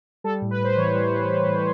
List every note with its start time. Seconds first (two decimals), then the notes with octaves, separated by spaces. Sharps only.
0.24 G3 A4
0.42 A2
0.51 B4
0.59 A2
0.64 C5
0.77 E3 C#5
0.94 G3
1.12 E3
1.30 G3
1.47 A2